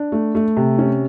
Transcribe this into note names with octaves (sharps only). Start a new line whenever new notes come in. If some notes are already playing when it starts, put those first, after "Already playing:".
Already playing: D4
A3
A3
C3
C#4